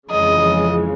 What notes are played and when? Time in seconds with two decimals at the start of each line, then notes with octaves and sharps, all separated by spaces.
0.11 F2 C#3 E3 G#3 D#5